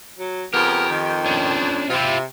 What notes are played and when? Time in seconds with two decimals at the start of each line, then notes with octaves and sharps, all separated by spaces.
0.18 F#3
0.54 F2 C#3 B3 G4 A#4
0.90 D#3
1.26 C#4 D4
1.90 C3 E4 F4